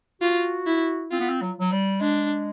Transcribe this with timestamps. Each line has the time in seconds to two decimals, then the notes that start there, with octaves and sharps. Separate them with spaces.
0.22 F4 F#4
0.66 E4
1.11 C4 F4
1.20 B3
1.29 C4
1.42 F#3
1.60 F#3
1.72 G3
2.01 G#3 D4